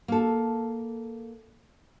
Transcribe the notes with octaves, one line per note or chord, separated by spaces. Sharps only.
A#3 A4